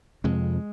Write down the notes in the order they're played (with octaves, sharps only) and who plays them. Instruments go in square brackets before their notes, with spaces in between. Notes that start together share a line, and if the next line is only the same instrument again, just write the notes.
[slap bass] F2 C3 G#3